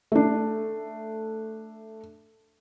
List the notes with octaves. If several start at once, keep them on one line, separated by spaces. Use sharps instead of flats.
A3 D4